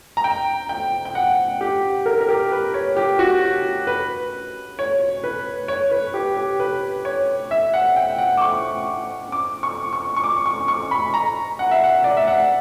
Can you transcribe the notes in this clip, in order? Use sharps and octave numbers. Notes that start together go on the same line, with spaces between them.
A#5
G5
G5
G5
F#5
G4
A#4
A#4
G4
B4
C#5
G4
F#4
B4
C#5
B4
C#5
B4
G4
G4
B4
C#5
E5
F#5
G5
F#5
D6
C#6
D6
C#6
C#6
C#6
D6
C#6
C#6
B5
A#5
F#5
E5
F#5
D5
E5
F#5